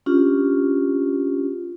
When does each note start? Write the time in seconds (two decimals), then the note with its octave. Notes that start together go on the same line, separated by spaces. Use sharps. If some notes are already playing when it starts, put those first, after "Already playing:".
0.06 C#4 D4 F4 G4